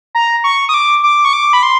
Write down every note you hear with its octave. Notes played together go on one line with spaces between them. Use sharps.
A#5
C#6
D#6
D6
D6
C#6
D6
B5
C6